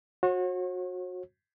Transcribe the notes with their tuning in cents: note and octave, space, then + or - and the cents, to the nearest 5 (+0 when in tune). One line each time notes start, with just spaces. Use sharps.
F#4 -25 C#5 -45